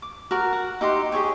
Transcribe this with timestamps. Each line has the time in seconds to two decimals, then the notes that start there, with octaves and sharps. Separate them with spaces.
0.02 D6
0.31 F#4 A#4
0.53 F#5
0.81 D#4 G4 E5 C6
1.12 G4 G#4 C#5 G5